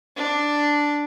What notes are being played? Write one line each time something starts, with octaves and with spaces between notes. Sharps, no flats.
D4